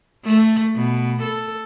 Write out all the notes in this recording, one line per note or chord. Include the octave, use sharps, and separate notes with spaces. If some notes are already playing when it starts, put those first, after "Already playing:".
A3
B2
A4